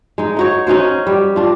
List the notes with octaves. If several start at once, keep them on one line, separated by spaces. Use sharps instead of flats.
G#3 D#4
D#4 F#4 C#5
C#4 D#4 F#4 C5
G3
D4 F4